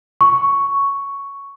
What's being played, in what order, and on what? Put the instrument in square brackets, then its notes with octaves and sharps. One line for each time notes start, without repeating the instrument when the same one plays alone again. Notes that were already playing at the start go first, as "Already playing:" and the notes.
[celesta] C#6